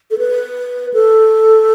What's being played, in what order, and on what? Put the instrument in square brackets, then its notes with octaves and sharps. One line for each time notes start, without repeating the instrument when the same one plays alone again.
[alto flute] A4
B4
A4